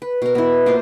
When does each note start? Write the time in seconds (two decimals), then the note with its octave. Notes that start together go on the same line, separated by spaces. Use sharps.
0.02 B4
0.22 B2 A#4
0.35 B3 E4
0.66 A#3 F4 C5